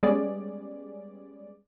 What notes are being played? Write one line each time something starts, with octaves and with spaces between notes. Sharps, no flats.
G3 G#3 B3 C#4 G#4 D5